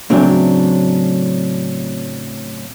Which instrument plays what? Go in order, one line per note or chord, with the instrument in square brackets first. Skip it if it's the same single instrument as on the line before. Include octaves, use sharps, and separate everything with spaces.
[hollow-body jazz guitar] A2 C#3 F#3 C4 D4